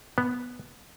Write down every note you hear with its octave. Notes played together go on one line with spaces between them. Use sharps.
B3